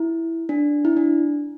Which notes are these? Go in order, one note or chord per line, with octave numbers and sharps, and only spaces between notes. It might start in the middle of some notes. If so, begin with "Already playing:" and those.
Already playing: E4
D4
E4
D4